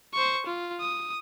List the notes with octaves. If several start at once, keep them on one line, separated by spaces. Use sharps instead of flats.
C5 C#6
F4
D#6